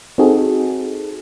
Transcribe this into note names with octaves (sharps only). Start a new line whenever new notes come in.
C4 D#4 F#4 G#4 A4